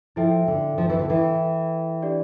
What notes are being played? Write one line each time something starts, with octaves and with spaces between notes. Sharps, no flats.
F3 E4 A4 E5 G5
D3
F3
E3
D3
E3 E4 A4 E5 G5
D4 G4 D5